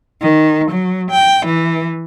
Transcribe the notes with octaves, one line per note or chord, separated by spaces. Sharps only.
D#3
F#3
G5
E3